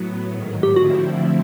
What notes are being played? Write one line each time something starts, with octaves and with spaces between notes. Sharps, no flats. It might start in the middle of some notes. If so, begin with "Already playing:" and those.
Already playing: A2 F#3 B3
G#2 D#3 F#3
G4
D3 F3 A3 C4 E4 F#4